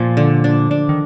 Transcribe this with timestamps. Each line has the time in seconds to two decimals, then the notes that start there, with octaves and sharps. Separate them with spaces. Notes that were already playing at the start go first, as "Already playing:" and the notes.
Already playing: A#2 F3
0.17 D3
0.44 D4
0.71 D4
0.89 D#3